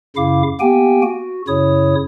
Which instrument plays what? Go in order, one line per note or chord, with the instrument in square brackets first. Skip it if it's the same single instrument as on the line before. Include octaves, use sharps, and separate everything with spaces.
[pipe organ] F#2 C#3 E4 F5 D6
A#3 B3 G4 G5 G#5
F#4
F#2 C#3 E4 C#5 D#6